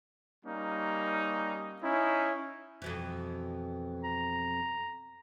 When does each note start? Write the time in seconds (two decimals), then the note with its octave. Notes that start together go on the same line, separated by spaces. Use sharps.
0.45 G3 A#3 C#4 D#4
1.82 C#4 D#4 E4
2.82 F2 B2 E3
4.04 A#5